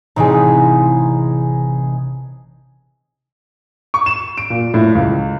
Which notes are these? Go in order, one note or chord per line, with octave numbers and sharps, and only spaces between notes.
A1 C3 C4 D#4 G#4
C#6
E7
D7
A#2
A2
C#2